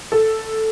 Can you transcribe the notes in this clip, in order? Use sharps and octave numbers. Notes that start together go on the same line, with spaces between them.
A4